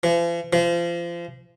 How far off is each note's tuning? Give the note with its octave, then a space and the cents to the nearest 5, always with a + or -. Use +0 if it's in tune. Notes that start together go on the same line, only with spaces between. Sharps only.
F3 -45
F3 -30